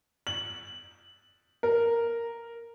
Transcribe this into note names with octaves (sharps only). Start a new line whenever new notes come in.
F#7
A#4